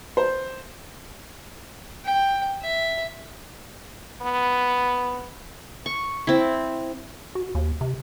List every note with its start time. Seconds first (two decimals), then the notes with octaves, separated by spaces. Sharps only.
0.17 C5
2.05 G5
2.62 E5
4.22 B3
5.86 C#6
6.27 C4 E4
7.35 F#4
7.55 D#2
7.81 C3